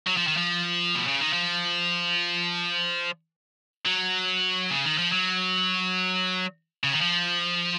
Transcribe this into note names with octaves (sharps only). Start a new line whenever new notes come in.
F#3
F3
D#3
F3
B2
C#3
D#3
F3
F#3
C#3
D#3
F3
F#3
C#3
D#3
F3